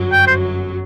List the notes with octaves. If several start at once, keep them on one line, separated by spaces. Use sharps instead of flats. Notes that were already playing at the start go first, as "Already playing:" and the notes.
Already playing: G1 F#2 F#3
G5
C5